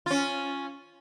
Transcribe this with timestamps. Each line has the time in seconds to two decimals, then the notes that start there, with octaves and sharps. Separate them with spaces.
0.06 C#4 F4